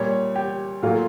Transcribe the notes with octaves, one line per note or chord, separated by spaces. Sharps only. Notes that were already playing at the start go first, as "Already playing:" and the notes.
Already playing: A#2 G3 C#5
G4
A#2 F#3 A3 F4